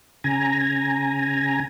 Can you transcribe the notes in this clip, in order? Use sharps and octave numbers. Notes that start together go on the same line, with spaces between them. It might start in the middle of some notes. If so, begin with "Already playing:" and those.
C#3 G#5 A#5